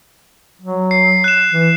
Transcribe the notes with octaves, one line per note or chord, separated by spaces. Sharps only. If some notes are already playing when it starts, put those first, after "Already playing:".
F#3
C7
F#6 E7
E3